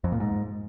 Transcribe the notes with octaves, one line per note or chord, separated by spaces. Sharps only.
F2
A#2
G#2